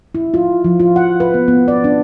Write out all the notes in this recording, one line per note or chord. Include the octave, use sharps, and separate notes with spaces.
E4
F4
F3
F4
F#5
B4
B3
B3
D5
D4